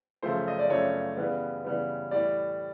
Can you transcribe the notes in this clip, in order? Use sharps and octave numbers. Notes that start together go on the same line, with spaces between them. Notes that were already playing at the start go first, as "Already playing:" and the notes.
F#2 C#3 F3 A3 C5
D#5
D5
F#2 C#3 F3 A3 C#5
C#3 E3 G3 B3
C#3 E3 G3 B3
A2 E3 G3 D5